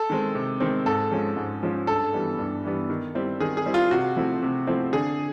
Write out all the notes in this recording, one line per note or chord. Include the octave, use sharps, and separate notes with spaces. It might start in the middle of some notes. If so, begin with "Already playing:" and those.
Already playing: A4
D#3 G#3 C4
C3
D#3 G#3 C4
G#2 A4
F3 G#3 C#4
G#2
F3 G#3 C#4
G2 A4
E3 G3 B3
G2
E3 G3 B3
D#3
G3 C4 E4
D#3 G#4
G#4
G3 C4 E4
F4
C3 F#4
F3 A3 C4 E4
C3
F3 A3 C4 E4
D3 G#4